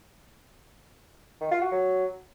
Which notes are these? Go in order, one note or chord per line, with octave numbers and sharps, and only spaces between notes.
D#3
F4
F#4
F#3